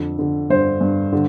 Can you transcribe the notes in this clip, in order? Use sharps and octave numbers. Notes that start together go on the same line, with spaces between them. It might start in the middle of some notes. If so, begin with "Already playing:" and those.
Already playing: F2 D3
D3
G2 C5
G2
D3